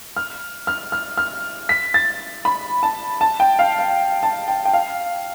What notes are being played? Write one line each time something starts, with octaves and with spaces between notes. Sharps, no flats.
F6
F6
F6
F6
B6
A6
B5
A5
A5
G5
F5
F5
A5
G5
G5
F5